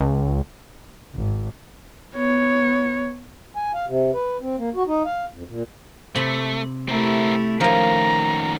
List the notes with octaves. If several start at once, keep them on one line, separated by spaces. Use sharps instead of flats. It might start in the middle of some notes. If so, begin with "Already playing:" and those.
C#2
G#1
B3 C#5
G#5
F5
C3
B4
C4
A#3
F#4
D#4
F5
F2
A#2
C3 A3 B5
A3 C4 E4 G4 A#4
D#3 F3 A3 A#3 C#4 A#5